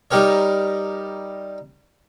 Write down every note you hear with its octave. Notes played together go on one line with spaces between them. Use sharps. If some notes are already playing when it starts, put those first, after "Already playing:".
G3 D#4 G4 A#4 C#5